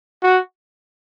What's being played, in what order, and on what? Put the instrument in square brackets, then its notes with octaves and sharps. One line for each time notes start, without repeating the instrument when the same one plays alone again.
[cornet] F#4